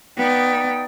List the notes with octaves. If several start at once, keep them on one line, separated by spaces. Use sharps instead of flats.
B3 D#4 D5 G5